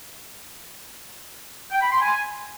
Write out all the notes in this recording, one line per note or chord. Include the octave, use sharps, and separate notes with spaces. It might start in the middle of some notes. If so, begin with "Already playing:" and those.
G5
B5
C6
G#5